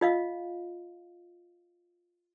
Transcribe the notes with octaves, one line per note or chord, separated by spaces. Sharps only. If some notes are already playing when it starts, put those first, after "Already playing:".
F4 D#5 F5